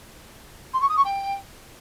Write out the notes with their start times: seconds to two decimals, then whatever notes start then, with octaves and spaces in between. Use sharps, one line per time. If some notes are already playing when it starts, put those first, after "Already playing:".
0.73 C6
0.81 C#6
0.88 D#6
0.96 C#6
1.04 G5